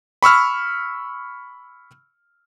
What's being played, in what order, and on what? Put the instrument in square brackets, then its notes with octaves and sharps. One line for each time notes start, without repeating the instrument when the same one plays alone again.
[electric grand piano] B5 C#6 E6 F6